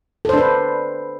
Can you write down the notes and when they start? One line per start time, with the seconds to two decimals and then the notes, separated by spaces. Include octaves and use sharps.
0.25 A4
0.29 C5
0.33 D4
0.38 B4